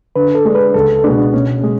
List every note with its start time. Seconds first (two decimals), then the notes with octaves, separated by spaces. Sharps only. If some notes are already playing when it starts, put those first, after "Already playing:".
0.16 D3 B4
0.35 A4
0.45 G#3 D4
0.55 B4
0.74 C#2 A4
1.04 B2 G#3 B3 D4
1.33 B2 C#4
1.63 G#3